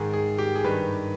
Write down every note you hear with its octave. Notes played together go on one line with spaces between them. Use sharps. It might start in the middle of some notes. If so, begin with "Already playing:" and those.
Already playing: G#2 D#3 G#4
G#4
G4
G#4
G2 D#3 B4